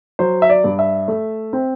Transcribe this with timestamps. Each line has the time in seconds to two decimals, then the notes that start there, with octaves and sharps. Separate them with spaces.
0.19 F#3 C5
0.42 E5
0.49 D5
0.64 G2
0.79 E5
1.08 A3
1.53 C4